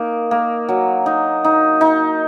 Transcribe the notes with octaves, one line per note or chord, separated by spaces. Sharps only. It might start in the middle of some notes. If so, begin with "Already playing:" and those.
Already playing: A#3 D#4
A#3
F#3
D#4
D#4
D#4